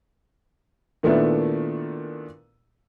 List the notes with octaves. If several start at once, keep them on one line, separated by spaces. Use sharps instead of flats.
A#2 D#3 A3 B3 D4 E4